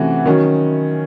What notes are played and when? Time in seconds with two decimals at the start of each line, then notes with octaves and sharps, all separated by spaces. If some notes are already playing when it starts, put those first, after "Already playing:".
Already playing: C3 E3 A3 C#4 F#4
0.26 D#3 F#3 C#4